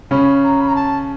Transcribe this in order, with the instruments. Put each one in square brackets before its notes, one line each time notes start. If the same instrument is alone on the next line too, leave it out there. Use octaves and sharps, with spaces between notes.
[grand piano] C#3 C#4 [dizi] B5
[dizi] A#5
B5
A#5
A5